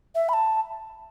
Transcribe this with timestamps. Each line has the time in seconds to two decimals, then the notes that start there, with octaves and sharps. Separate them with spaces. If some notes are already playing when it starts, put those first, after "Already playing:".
0.15 E5
0.29 B5
0.33 A5